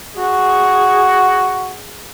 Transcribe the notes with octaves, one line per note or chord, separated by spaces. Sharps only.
F#4 G#4